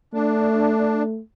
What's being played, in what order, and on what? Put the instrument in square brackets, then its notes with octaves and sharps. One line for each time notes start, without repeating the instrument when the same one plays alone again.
[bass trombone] A3 [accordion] D4